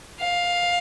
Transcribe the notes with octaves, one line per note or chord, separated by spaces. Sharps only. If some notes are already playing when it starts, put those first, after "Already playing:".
F5